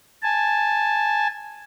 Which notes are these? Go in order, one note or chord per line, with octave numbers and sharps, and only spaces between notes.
G#5 A5